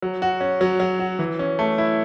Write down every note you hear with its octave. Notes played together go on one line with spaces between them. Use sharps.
F#3
F#4
C#4
F#3
F#3
F#4
E3
C#4
A3
E4